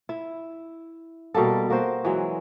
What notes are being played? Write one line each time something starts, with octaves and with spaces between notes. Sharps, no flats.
E4
B2 G3 A#3 A4
A#3 F#4 C5
E3 F#3 G#3